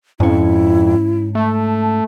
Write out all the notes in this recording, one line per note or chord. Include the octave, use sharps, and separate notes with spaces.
F2 G#2 C#4 E4
A3 A5